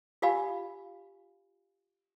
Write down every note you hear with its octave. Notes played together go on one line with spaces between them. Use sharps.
F4 G4 D5 F5 G#5 B5